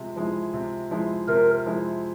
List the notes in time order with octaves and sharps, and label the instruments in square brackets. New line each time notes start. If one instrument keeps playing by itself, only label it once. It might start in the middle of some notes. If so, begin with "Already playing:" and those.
Already playing: [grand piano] C3 F3 G#3
F3 G#3 E4
C3
F3 G#3 E4
[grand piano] C3 [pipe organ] A#4
[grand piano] F3 G#3 E4